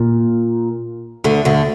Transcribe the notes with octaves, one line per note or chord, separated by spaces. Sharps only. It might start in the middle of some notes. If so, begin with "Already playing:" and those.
Already playing: A#2
D2 D3
D2 D3